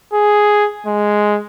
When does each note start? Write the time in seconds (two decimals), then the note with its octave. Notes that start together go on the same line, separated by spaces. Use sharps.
0.13 G#4
0.86 G#3